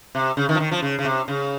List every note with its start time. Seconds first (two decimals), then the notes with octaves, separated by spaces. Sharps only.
0.15 C3
0.37 C#3
0.49 D#3
0.55 F3
0.60 D#3
0.71 F3
0.82 C#3
0.99 C#3
1.05 C3
1.28 C#3